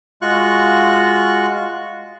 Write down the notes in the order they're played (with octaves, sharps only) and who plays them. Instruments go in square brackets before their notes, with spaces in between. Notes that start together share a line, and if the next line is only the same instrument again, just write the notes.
[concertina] G#3 F4 F#4 C#6 F#6